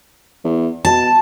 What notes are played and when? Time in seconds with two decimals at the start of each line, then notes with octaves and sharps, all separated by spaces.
0.44 E2
0.85 B2 A5